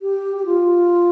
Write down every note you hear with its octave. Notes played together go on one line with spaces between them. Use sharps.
G4
G4
F4